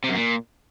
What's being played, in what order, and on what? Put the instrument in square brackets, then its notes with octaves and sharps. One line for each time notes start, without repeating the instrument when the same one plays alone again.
[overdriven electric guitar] C3
F#2
A#2